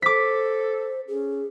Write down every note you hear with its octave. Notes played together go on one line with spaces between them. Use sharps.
A4 C5 D6 B6
C#4 G#4